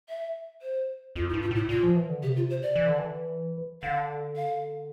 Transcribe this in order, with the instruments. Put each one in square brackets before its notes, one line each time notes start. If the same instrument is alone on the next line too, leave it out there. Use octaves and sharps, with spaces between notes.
[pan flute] E5
C5
[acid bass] F2 [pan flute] F4
[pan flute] E4
[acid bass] G2
[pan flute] F4
[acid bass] A2 [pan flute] E4
[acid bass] A#2 [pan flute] F4
[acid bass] F3
E3
D3
[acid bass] C3 [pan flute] G4
[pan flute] F4
C5
D5
[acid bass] E3
D3
E3
[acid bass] D3 [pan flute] F5
[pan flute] F5